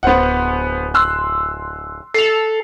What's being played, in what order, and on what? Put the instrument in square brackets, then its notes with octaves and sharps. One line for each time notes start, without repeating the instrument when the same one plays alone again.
[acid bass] D1 [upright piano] B3 C5 F#5
[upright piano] C6 E6 F#6
[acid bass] A4 [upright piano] C7 F7